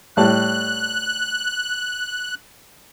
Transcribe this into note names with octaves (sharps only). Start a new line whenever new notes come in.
A2 G3 A5 F#6